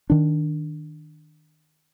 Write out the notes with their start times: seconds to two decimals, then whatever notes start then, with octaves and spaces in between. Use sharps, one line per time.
0.10 D#3 D4